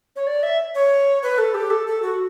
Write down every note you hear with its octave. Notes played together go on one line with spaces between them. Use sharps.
C#5
D5
E5
C#5
B4
A4
G4
A4
A4
F#4